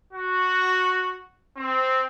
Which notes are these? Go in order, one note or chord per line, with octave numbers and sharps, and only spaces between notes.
F#4
C4